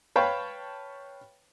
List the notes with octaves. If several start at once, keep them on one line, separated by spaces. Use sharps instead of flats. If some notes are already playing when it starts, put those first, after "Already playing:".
B4 C#5 F5 G5 A5